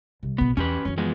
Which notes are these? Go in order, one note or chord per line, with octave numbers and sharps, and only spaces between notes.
C2
A#1 B2 B3
E2 C#4 G4 B4
F#2 E3 C#4
F3 G#3 B3